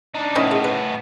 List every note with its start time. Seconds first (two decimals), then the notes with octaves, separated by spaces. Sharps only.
0.15 D4 D#4
0.36 A2 D#3 B3 C#4 E4 D#5 A#5
0.51 G#3
0.64 B4